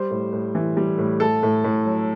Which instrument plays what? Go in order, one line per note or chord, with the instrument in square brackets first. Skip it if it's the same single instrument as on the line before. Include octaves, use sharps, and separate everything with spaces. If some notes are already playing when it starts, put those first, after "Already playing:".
Already playing: [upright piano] G3 C5
A2
A2
E3
G3
A2
A3 A4
A2
A2
F#3